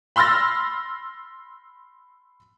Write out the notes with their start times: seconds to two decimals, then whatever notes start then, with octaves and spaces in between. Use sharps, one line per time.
0.16 B5 C6 E6 F6 A6 A#6